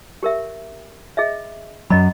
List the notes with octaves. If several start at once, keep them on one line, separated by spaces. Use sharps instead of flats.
G4 A#4 E5
G#4 D#5 E5
F#2 F#3 D#5 B5